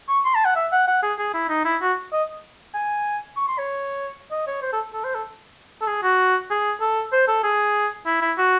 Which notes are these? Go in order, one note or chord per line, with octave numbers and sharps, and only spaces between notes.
C#6
C6
A5
F#5
E5
F#5
F#5
G#4
G#4
E4
D#4
E4
F#4
D#5
G#5
C#6
C6
C#5
D#5
C#5
C5
A4
A4
C5
A4
A4
G#4
F#4
G#4
A4
C5
A4
G#4
E4
E4
F#4